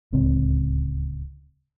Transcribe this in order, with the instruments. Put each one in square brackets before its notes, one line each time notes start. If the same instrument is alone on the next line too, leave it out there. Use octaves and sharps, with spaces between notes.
[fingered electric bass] D1 C#2 C4